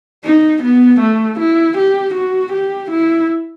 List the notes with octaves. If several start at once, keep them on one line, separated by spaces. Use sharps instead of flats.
D#4
B3
A3
E4
G4
F#4
G4
E4